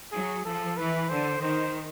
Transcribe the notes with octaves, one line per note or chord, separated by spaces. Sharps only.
F#3 G#4
F3 A4
E3 B4
D3 C5
D#3 C5